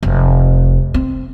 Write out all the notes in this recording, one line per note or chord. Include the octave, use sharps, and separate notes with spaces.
F1
C4